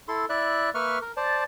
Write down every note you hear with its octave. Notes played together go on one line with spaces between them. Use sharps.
E4 A4 C6
E4 D5 E5 F#6
A#3 B4 E5 C#6 F6
A#4
C5 D5 A5